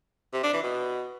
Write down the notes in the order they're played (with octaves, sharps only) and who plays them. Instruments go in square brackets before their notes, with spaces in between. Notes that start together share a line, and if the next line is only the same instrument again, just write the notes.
[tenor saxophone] C3
D4
E3
B2